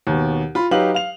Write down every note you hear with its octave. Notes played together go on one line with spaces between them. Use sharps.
D#2 B2
F4 B5
F#3 D#4 G4 B4 F5 F#7
F5 F7